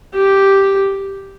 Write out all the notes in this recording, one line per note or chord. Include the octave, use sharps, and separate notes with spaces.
G4